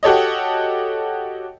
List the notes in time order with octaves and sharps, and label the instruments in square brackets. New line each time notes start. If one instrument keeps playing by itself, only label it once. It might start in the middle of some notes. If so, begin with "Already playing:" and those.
[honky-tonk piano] F#4 G4 A4 C#5 D#5